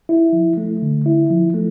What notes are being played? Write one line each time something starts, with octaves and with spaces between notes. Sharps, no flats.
E4
F3
A3
D3
E4
F3
A3